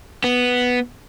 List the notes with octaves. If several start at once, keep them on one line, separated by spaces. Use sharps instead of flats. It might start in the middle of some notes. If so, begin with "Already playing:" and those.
B3